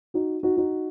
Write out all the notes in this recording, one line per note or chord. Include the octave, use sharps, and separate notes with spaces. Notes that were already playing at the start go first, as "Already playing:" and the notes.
D#4 F#4
D#4 F#4
D#4 F#4